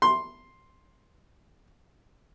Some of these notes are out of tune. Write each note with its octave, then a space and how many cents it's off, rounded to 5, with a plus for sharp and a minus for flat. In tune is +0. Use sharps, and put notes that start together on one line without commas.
C6 +5